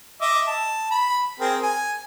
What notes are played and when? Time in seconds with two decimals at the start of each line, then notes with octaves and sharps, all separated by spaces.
0.21 D#5 E5 D6
0.47 A5
0.91 B5
1.40 C4 G#4 A#4
1.63 G#5